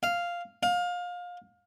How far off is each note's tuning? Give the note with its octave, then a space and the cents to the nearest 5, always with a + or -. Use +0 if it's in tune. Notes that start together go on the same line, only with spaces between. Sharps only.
F5 -5
F5 +25